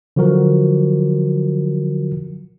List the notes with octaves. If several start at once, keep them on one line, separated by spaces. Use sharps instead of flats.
D3 F3 F#3 F#4 A#4